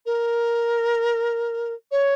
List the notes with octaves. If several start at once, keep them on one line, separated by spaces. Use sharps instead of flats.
A#4
C#5